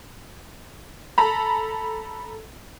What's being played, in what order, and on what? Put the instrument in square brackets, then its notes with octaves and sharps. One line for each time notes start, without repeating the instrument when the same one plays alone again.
[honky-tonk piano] A4 A#5 B5